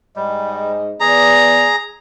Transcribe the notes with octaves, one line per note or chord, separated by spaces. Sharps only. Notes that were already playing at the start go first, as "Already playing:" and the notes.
G#2 G3 D#5
E3 B3 G#4 D5 A#5